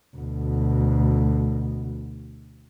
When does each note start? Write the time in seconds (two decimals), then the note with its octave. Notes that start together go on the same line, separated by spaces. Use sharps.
0.17 D2 B2